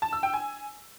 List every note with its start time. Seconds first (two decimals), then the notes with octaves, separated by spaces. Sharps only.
0.02 A5
0.13 E6
0.23 G5
0.33 G#5